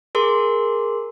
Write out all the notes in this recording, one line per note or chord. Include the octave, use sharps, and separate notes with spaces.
G#4 A#4 C6